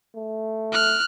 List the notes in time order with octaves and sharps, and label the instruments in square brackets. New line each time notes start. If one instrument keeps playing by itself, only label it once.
[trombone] A3
[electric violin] F6 F#6